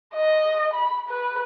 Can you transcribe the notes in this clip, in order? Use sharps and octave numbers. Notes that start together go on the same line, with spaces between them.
D#5
B5
B4